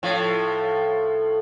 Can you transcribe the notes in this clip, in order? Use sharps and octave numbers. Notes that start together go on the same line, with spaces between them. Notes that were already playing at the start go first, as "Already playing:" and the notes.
A2 F3